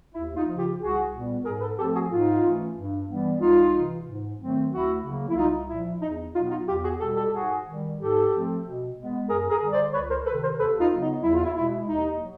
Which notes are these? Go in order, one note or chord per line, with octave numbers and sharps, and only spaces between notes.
D#2 E4
D#4 F4
C#3 F3
F4 G4
C2 F#4 G#4
A#2 G3 B3
G#2 G#4 A#4
A4 B4
F3 A3 C4 G4 A4
F#4 G#4
G#2 D#4 F4
E3 A3 C#4
G2
E3 G3 B3
C2 D#4 F4
C3 E3
G#2
D#3 F#3 A3 C4
D2 E4 F#4
C#3 F#3 A#3
E4
C2 D#4 F4
A#2 F3 E4
E2 D#4
B2 F#3 B3 D#4 F4
D#4 F4
E2 F4 G4
F#4 G#4
B2 G3 G4 A4
G4 A4
G#2 F#4 G#4
D#3 G3
G#2 G4 A4
F3 A3 C4
B2
G#3 B3
F#2 G#4 A#4
G#4 A#4
D3 G3
C5 D5
C#2 B4 C#5
A#4 C5
C3 D#3 A4 B4
A#4 C5
D#2 A4 B4
D#4 F4
C#3 F#3 B3
D#4
E2 E4
F4
E4
B2 G#3 E4
D#2 D#4
F#3